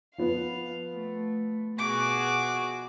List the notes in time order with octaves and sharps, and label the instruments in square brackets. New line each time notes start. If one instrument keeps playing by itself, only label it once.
[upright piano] F3 B3 [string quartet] F5
[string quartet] A3
[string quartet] B2 F#4 G#4 [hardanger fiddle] D6